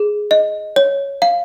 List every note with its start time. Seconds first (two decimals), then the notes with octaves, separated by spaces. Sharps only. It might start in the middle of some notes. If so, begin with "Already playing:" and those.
Already playing: G#4
0.31 D#5
0.76 C#5
1.22 F5